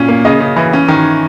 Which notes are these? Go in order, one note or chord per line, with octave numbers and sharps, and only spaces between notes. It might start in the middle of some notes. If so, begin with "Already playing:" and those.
Already playing: A#2 C#4
A#3
C#3 D#5
C#3
E3
C#4
D#3